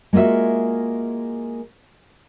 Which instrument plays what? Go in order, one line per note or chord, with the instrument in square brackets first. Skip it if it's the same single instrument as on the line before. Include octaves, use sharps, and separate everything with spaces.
[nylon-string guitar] G#3 A#3 F4 F#4 E5